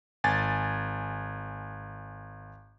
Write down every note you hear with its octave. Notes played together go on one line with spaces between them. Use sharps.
G#1 G#5 A6